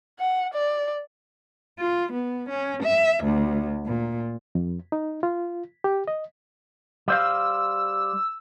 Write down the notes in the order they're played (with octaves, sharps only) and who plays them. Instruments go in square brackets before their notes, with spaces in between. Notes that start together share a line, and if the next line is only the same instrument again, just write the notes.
[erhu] F#5
D5
[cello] F4
B3
C#4
E5
D2
A#2
[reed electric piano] F2
D#4
F4
G4
D#5
[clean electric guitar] G3 C5 F5 [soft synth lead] E6